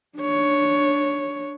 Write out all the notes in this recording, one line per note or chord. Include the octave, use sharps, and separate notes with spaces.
D4 C#5